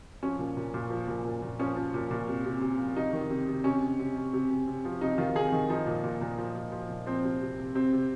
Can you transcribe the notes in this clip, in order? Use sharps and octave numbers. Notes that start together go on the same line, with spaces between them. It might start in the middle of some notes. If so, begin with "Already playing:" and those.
F3 C#4
A#2
A#2
A#2
F3
A#2
A#2
A#2
F3 C#4
F3
A#2
A#2
C3
C3
C3
F3
C3 D#4
D#3
C3
C3
C3 C#4
C3
C3
C3
C3
C3
C3
F3
C3 D#4
D#3 F4
C3 G#4
D#3
F3 D#4
A#2
A#2
A#2
F3
A#2
F3
A#2
F3 C4
C3
C3
C3
C3 C4
C3